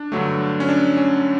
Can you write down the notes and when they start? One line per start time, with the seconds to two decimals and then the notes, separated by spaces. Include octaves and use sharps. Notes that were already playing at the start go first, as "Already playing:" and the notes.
Already playing: D4
0.12 G2 D3 F#3 A3
0.60 C#4
0.69 D4
0.97 C#4